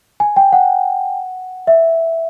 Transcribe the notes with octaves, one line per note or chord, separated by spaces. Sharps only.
G#5
G5
F#5
E5